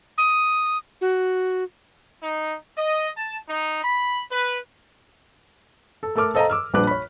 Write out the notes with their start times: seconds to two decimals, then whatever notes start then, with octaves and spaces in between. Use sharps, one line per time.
0.18 D#6
1.01 F#4
2.22 D#4
2.77 D#5
3.17 A5
3.48 D#4
3.83 B5
4.30 B4
6.03 A4
6.16 A3 A4 A#4 D6 F6
6.35 A4 C5 D#5 F5 A5 A#5
6.50 D6 E6 F6
6.74 A#1 G3 D4 B4 D6 F#6
6.87 C#5 B5